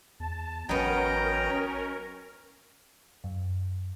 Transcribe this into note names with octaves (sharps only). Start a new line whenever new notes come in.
E2 A5
A1 F#3 B3 C#4 A#4 D#5 G5 A#5
F#2